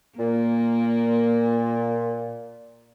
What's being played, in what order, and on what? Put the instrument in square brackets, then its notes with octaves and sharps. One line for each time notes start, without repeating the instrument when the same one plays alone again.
[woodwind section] A#2 [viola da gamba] A#3